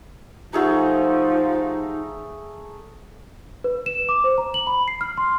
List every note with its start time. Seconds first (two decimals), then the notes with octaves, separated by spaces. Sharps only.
0.53 F3 A3 D#4 F4 G4 G#4 F#5 A#5
3.64 B4
3.86 E7
4.09 D6
4.24 C5
4.38 A#5
4.54 F#7
4.67 B5
4.88 C7
5.01 F6
5.18 C6